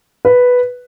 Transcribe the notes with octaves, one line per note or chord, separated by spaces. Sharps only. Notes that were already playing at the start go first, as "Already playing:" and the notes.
B4